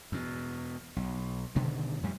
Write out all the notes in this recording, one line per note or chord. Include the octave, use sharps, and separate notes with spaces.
E2 B2
B1
G2 B2 D3 D#3
F2 A2 G3